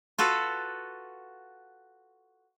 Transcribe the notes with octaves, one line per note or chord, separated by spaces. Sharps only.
F4 F#4 A4 B4